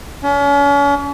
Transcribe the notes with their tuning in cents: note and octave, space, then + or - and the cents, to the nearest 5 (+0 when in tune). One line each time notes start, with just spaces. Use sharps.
C#4 +40